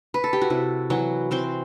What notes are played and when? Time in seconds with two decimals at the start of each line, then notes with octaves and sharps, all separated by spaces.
0.14 B4
0.24 A4
0.33 G4
0.41 F#4
0.50 C3 E4
0.90 E3 F#3 F#4
1.31 E3 C4 C5